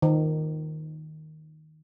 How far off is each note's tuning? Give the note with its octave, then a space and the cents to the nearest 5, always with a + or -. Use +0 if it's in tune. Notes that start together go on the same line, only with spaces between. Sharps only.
D#3 +0